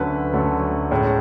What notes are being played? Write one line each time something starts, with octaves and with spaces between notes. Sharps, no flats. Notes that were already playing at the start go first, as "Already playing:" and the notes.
Already playing: D2 D3 F#3 A3 C#4 B4
D2 D3 F#3 A3 C#4
A2 G#3 C#4